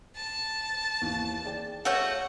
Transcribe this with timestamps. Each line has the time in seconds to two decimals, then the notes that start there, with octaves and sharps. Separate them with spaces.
0.16 A5
1.01 D#2 E3
1.45 G#4 D5 G5
1.85 A3 F#4 C#5 F5 F#5 G6